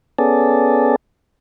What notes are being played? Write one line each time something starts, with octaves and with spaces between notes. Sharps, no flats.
B3 C#4 G#4 A4 D5